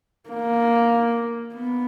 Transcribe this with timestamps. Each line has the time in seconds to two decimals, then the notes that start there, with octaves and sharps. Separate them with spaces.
0.30 A#3
1.54 B3